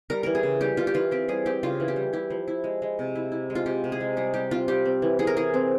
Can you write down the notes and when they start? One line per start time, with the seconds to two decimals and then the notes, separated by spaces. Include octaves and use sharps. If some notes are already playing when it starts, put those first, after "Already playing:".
0.10 G3 A#4
0.23 E3 A#4
0.35 G#4
0.43 C#3
0.61 G3 G4
0.77 G3 F4
0.87 G4
0.94 E3 F4
1.11 C4 G4
1.28 G3 G#4
1.46 C4 G4
1.63 C#3 F4
1.80 E3
1.88 G4
1.96 G3
2.13 E4 G4
2.30 F3
2.48 E4
2.64 G#3
2.82 G#3
2.99 C3
3.15 E4
3.32 E4
3.50 G#3
3.55 F4
3.66 C3 G4
3.84 C3
3.92 G#4
4.00 G#3
4.17 G3 G#4
4.34 G3 G4
4.51 C4 F4
4.68 G3 G4
4.85 C4
5.02 E3
5.19 E3 G#4
5.27 A#4
5.36 E3 G#4
5.54 C4